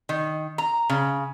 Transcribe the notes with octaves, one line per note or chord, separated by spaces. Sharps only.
D#3
A#5
C#3